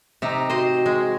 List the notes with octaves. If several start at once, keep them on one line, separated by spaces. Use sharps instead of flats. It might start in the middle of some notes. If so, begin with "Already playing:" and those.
C3 D#4 A#5
F#4 C5 D#5
G#3